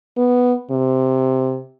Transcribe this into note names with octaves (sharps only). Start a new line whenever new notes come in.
B3
C3